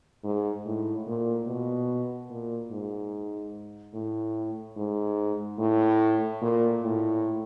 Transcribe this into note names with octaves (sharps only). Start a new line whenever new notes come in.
G#2
A2
A#2
B2
A#2
G#2
A2
G#2
A2
A#2
A2